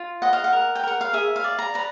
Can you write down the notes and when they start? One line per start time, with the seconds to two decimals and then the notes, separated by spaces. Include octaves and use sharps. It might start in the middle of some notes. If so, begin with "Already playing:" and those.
Already playing: F4
0.22 D#5 F#5
0.33 F5
0.44 F#5
0.53 A#4
0.75 G5
0.83 A#4 F#5
1.01 F5
1.13 G#4 E5
1.36 F5
1.44 D5
1.59 A#5
1.74 B4 A#5